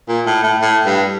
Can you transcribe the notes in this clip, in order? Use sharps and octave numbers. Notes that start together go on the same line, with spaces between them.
A#2
A2
A2
A2
G2